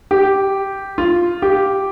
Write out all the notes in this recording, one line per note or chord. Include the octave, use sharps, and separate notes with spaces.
G4
F4
G4